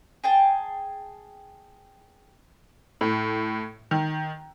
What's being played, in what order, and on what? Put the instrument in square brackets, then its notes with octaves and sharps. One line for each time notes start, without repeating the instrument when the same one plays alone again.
[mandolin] G#4 G5 A5
[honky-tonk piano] A2
D#3